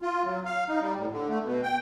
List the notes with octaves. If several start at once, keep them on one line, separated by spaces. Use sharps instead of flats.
F4
F#3
F5
D#4
G3
A2
D3
A3
B2
G5